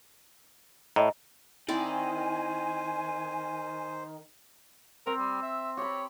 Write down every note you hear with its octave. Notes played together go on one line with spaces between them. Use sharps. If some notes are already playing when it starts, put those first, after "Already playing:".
A2 D#5 E5 A#5
D#3 C4 E4 C5 D5 G#5
C4 A#4
G3
E5
G4 C#5 B5